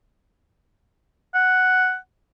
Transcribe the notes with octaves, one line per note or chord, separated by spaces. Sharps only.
F#5